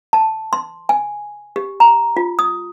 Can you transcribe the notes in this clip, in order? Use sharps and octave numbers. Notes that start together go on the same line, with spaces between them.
A5
C6
G#5
G4
A#5
F4
D#6